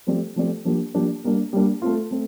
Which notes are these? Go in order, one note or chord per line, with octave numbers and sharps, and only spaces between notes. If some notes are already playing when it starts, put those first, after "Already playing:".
F3 A3 C4 G4 D5
F3 A3 C4 G4 D5
F3 A#3 D4 G4
F3 A#3 D4 G4
G3 A#3 D4
G3 A#3 D4
A3 C4 F4
A3 C4